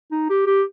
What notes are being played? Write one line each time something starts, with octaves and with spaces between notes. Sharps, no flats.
D#4
G4
G4